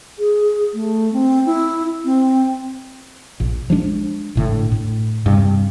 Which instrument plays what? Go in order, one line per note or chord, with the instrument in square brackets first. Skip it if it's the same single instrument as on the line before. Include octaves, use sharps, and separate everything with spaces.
[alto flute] G#4
A3
C4
E4
C4
[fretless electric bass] A#1 A#2
F3 G#3 D4
G#1 A2 D3
A2
G2 C3